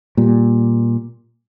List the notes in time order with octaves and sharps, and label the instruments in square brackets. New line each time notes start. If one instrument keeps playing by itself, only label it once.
[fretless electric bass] A#2 G3